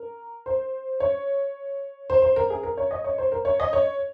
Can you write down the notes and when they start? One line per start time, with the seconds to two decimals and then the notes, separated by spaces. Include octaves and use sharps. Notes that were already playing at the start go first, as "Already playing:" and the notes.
Already playing: A#4
0.46 C5
1.00 C#5
2.10 C5
2.22 C5
2.36 A#4
2.50 G#4
2.63 A#4
2.78 C#5
2.91 D#5
3.04 C#5
3.18 C5
3.32 A#4
3.45 C#5
3.60 D#5
3.73 C#5